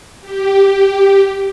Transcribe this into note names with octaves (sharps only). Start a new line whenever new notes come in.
G4